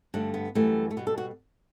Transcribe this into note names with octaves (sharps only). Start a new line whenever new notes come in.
G2 D3 A3 D4
B3
F#2 E3 G3 A3
A3
B2 G3 B3
A4
F#4